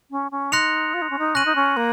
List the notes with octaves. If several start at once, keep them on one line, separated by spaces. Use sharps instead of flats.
C#4
C#4
D#4 C6 F#6 A#6 C#7 F7
F4
D#4
C#4
D#4
C#4 F#6 A#6 D#7 F#7
D#4
C#4
A#3